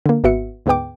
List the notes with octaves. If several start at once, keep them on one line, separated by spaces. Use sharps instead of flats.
D3 A#3
G#1 B3 F#4 E5 C#7
D2 G#2 G#3 B3 G5 D6